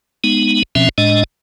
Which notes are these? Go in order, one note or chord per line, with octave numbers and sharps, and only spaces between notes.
G#3 B3 D#4
B2 F3 C4 C#4 E5
A2 G#3 D4 D#5